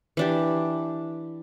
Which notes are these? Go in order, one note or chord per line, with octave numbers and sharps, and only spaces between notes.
E3 D4 G4